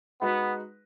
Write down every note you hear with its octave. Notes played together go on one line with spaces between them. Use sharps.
G#3 B3 D#4 F#4 B4